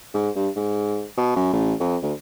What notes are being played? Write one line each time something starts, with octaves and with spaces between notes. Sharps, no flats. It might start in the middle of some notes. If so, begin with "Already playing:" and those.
G#2
G2
G#2
B2
F#2
A1
F2
D2